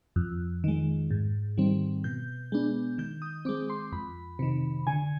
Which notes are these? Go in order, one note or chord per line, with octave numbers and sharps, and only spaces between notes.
F2
D#3 G#3
G#2
D#3 G3 C4
B2 G6
G#3 B3 D4
D#3 G6
D#6
G#3 C4 D6
C6
F2 B5
C3 D#3
D3 G#5